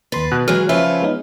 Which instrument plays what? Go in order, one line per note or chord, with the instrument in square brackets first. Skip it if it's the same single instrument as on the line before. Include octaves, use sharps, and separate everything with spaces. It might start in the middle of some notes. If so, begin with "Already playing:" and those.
[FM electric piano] D#2 C6 A6 [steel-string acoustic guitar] B4
[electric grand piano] B2 [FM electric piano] F#6
[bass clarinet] E3 [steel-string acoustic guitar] F#3 G#3 [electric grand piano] F6
[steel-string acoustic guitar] C#3 F4 B4 [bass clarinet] F3 [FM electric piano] C#4 [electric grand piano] C#5 E5
[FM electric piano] G#3 B3 D#4